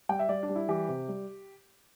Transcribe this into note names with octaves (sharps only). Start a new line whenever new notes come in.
G3 G5
E5
G3 D5
D4
G3
E4
E3 G4
C3
G3